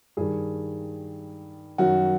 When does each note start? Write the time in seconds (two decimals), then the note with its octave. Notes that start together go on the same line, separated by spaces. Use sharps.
0.17 G2 D#3 G#4
1.78 F#2 D#3 F#4